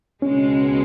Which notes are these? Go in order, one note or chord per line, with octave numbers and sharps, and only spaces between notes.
C#2 B2 G#3 C#4